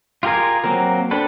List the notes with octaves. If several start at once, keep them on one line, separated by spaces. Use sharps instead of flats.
F4 G4 G#4 A#4 G#5
F#3 A#3 C4 A#4
C4 D4 A4 B4